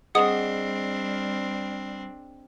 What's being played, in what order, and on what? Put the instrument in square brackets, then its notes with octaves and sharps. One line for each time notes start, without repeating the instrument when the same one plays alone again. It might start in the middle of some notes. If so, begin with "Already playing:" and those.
[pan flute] G3 [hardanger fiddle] C4 D4 [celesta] G#4 D#5 [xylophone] F#5 D#6